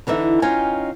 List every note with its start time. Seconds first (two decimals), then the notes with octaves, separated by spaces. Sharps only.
0.07 D3 E3 D#4 E5
0.42 C#4 D#4 F4 G5 G#5